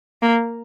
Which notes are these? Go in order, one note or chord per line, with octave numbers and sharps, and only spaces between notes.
A#3